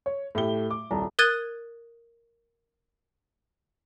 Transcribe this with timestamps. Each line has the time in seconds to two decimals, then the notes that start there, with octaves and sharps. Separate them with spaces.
0.06 C#5
0.35 A2 A3 G4 G7
0.71 D6
0.91 D#1 C2 A5 A#5
1.19 A#4 D#6 F#6 G#6 A6 D#7